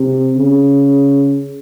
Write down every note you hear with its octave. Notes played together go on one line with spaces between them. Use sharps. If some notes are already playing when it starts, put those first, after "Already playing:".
Already playing: C3
C#3